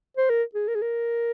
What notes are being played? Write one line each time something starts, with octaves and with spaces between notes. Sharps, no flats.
C5
A#4
G#4
A#4
G#4
A#4